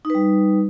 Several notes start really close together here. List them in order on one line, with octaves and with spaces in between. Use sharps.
D#4 B4 G3